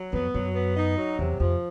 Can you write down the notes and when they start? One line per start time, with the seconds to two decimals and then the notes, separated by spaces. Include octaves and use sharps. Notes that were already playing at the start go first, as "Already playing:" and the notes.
Already playing: F#3
0.13 F2 B3
0.34 F#2 F#3
0.55 B3
0.76 D#4
0.97 F#3
1.18 E2 C3
1.40 F2 F3